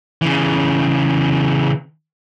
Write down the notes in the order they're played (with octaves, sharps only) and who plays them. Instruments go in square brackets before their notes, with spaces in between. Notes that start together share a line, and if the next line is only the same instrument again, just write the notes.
[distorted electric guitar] C#3 E3